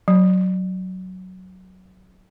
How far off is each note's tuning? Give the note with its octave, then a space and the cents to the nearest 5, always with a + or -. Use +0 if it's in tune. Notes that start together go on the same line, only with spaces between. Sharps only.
F#3 +5